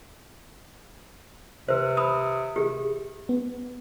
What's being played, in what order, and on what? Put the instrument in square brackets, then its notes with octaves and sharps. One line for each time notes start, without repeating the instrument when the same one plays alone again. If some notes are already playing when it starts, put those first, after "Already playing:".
[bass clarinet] C3 [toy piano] B4 C5
[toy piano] B5 D#6
G4 G#4
[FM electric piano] B3